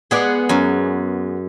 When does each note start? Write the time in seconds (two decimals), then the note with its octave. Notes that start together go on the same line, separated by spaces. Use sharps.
0.11 G#3 B3 G#4 D5
0.49 F#2